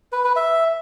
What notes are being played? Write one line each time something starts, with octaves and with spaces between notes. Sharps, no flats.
B4
B4
E5